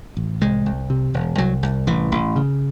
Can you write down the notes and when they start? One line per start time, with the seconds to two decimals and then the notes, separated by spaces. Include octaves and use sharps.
0.17 A1
0.41 C2 G#3
0.66 C2
0.90 C3
1.14 E1
1.38 C2 F#3
1.63 C2
1.87 A1 E3
2.12 A1
2.36 C#3